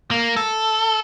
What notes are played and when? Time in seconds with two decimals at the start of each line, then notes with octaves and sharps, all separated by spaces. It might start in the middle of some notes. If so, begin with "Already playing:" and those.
0.11 A#3
0.36 A4